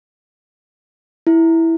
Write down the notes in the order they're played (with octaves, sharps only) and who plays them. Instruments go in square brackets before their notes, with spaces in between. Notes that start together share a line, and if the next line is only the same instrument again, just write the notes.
[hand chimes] E4